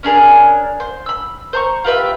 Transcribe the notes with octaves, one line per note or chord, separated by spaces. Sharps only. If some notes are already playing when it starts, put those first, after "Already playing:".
C#4 D4 G#4 A#4
C5
B5 E6
C5 A#5 C#6
F4 G4 B4 E5